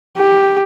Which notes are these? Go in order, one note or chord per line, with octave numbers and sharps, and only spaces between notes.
G4